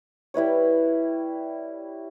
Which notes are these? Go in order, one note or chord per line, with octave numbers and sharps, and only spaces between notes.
G3 E4 B4 C#5